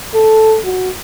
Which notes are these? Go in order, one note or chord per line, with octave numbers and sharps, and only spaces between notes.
A4
F#4